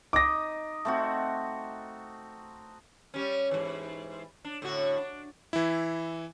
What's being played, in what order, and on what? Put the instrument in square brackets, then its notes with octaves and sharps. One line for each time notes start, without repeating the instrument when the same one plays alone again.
[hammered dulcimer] D#4 D#5 [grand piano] D6 A#6
[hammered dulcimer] A3 C4 F#4
[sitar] G3 C#4
G#2 E3
D4
A2 D3 F#4
D4
[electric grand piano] E3 E4